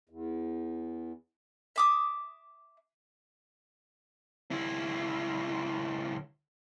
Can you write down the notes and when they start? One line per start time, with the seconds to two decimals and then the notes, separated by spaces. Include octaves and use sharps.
0.10 E2
1.76 E5 D6 D#6
4.51 C#2 E4